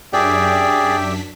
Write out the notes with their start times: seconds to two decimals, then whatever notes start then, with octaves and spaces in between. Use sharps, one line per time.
0.13 F#2 D4 G4 G#4 D5 E5 G5 B6